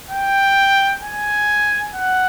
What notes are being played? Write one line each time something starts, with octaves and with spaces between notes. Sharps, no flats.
G5
G#5
F#5